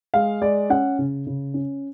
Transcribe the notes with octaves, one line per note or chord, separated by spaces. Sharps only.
G#3 F5
G#3 D5
C#4 F#5
C#3
C#3
C#4